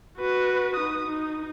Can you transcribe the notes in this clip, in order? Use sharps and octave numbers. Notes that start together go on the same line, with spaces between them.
F#4 B4
D#4 D#6
D#4